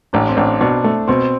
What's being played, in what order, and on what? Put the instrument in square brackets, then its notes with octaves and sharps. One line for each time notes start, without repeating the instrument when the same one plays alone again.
[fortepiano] A1 [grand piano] D4
[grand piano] C4
[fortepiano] A1 [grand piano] D4
[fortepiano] B2 [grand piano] D4
[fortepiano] A3
[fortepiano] B2 [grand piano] C4